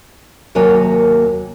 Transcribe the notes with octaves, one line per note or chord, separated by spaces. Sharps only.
D#2 C3 F#3 A#3 C#5 G#5